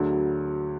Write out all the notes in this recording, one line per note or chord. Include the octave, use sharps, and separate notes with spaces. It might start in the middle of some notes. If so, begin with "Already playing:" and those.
Already playing: D2 D3 F#3 G#4